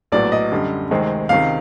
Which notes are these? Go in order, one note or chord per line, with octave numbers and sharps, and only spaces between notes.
A#1 A2 F#3 B3 D5
D#5
F#2 D3 G3
D2 C3 D#3 G#3 C4
C#2 C3 D#3 F5